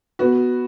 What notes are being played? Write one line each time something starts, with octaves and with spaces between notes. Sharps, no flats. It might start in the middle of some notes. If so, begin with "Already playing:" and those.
B3 F#4